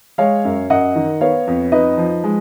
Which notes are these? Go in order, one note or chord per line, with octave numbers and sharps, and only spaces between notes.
G#3 C#5 F5
F#2
F#2 D#5 F#5
D#3
B3 C#5 F5
F2
D#4 B4 D#5
F3
G#3